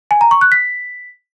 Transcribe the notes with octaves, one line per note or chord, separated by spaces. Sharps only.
G#5
A#5
C#6
F#6
B6